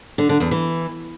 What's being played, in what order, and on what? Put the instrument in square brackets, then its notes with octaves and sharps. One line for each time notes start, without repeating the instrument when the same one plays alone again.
[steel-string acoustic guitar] D3
D3
E2
E3